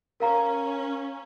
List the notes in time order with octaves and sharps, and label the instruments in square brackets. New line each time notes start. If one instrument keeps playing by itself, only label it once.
[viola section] C#4 [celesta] A#4 F5 A#5